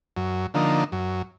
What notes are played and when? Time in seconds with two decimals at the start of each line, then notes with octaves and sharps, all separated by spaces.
0.17 F#2
0.54 D3 F3 A#3 D#4
0.92 F#2